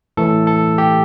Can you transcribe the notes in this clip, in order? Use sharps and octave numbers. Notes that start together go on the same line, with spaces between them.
A2 E3 A3 A4
A4
G4